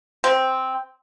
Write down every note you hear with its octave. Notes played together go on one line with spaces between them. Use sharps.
C4